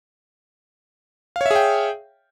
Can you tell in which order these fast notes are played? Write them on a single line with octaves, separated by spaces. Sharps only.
F5 C#5 E5 G#4 G5